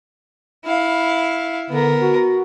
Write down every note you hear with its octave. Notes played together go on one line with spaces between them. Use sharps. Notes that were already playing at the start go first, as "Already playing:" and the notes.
E4 F5
D3 B3 A#4
F#4